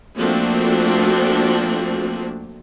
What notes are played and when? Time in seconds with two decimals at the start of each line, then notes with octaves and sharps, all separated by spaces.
0.17 F3 A3 A#3 C4 D4 F#4